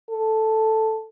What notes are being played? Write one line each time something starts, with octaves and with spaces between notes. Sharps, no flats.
A4